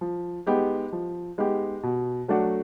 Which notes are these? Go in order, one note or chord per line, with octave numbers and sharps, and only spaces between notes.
F3
G#3 B3 D#4 G4
F3
G#3 B3 D#4 G4
B2
F#3 A3 D4 F#4